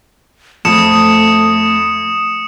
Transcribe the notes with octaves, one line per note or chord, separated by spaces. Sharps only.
F2 A3 D#6 C#7 E7